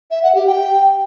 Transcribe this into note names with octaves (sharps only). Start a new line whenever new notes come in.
E5
F#5
G4
G5